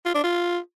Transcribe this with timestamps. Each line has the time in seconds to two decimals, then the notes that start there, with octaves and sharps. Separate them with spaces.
0.05 F4
0.14 D4
0.23 F4